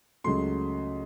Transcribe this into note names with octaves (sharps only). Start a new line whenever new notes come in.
C#2 C#3 F#3 A3 C6